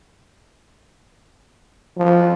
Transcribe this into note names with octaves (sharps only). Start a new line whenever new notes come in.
F3